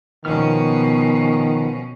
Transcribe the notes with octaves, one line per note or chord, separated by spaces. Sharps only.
B2 D#3 F3 B3 C#4 F6